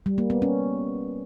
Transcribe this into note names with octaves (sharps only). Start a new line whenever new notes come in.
G3
A#3
B3
C#4